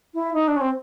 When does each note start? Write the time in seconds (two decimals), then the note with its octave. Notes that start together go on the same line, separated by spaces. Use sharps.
0.14 E4
0.33 D#4
0.47 D4
0.56 C#4
0.61 C4